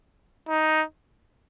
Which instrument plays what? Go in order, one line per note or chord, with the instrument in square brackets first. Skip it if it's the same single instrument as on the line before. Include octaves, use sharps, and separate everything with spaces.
[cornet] D#4